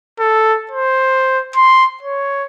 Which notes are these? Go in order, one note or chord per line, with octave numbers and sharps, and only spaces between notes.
A4
C5
C6
C#5